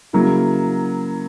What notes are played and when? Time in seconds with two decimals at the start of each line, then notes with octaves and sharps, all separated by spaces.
0.13 C#3 F#3 A#3 E4